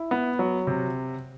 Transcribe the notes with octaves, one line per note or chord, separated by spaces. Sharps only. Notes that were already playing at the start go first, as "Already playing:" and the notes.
Already playing: E4
B3
F#3
C3